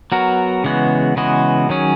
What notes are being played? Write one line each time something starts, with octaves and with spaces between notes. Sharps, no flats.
F#3 B3 F#4 A#4
C#3 E3 G#3 B3 F#4
C#3 E3 G#3 B3 F#4
D#3 F#3 C#4 G#4